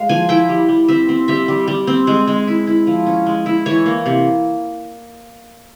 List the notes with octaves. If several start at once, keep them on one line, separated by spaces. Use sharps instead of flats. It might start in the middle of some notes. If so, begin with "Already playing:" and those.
Already playing: G#3 F5
F3 G#5
E4 G5
G3
G3
C4 E5
C4
G3 E5
G3
G3
C4
G#3
G#3
E4
E4
F3
C#4
G#3
E4
E3 C#5
A#3
C3